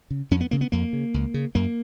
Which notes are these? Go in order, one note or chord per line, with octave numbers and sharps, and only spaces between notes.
C#3
F2 C#4
B3
C#3 A#3
B3
F2 A#3
C#3
C#2
C#3
F#2 A#3